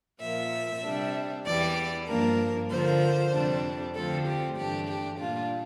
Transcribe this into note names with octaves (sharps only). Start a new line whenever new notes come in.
A#2 F3 A#3 E5
C3 G3 D4
E2 E3 G3 D5
G2 F3 A#3 D4 A#4
D3 F3 A#3 C5
F2 C3 G3 D4
D2 D3 F3 C4 A4
G4
G2 E3 A3 D4 G4
G4
A#2 G3 D4 F4